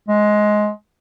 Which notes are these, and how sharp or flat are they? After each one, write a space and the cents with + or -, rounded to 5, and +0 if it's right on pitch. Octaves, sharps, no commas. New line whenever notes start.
G#3 +15